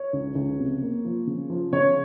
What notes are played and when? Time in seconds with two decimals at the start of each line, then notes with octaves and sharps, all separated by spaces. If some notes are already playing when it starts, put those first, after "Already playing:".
Already playing: C#5
0.13 C#2
0.35 C#2
0.59 C3
0.82 A#3
1.05 F3
1.27 C#3
1.50 F3
1.73 C#3 C#5